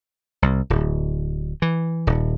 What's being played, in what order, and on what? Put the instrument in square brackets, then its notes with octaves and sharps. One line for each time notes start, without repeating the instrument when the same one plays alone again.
[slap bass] C2
D1
E3
D#1